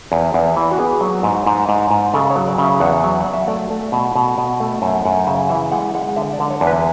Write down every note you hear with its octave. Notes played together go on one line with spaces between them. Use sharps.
E2
E2
E3
F#4
B3 G#4
F#3
G#2
G#2
G#2
G#2
C#3 A4
C#5
F#3
D5
C#3
E5
E2 F#5
F#3
F#3 F#5
E5
A3 D5
A3
B2
B2
B2
A3
F#2 E5
F#2 F#5
C#3 E5
E3 E5
G#3 F#5
G#3 F#5
D3 E5
D5
D3
C#5
E2
B4